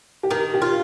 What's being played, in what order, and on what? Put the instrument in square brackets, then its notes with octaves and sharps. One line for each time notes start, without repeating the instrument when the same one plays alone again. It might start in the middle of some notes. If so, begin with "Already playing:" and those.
[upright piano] G4
[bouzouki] D#3 [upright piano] A#4
[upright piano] G4
[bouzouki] F4